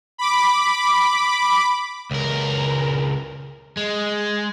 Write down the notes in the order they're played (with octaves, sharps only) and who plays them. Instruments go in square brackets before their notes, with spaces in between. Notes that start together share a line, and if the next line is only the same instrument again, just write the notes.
[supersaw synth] B5 D6
[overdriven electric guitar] C#2 A#4
G#3